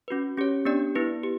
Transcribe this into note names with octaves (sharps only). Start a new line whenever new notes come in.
C#4 F#4 B4
C#4 G4 C#5
B3 D4 G4 D5
B3 E4 B4
G4